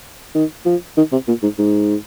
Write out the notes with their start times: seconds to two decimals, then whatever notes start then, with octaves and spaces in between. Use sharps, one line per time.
0.35 D#3
0.66 F3
0.97 D#3
1.12 C3
1.28 A#2
1.43 G#2
1.58 G#2